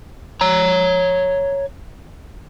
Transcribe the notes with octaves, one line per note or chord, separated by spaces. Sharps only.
C#5 A#5